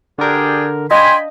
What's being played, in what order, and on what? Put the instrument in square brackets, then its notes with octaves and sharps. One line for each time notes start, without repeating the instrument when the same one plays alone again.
[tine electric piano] D3 A#4 [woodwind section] D4 G4 G#4
[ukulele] D4 D#5 F5 [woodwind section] G5 G#5 B5 [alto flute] C6